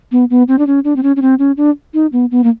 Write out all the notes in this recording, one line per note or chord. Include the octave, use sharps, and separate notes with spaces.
B3
B3
C4
D4
C#4
D4
C4
C#4
C#4
C4
C#4
D4
D#4
B3
B3
A#3